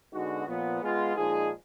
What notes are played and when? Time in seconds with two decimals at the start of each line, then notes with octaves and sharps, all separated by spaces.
0.13 D3 G#3 B3 D#4 F#4
0.48 A#2 F3 B3
0.81 G#3 B3 F4
1.15 A#2 F3 G#3 D#4 G#4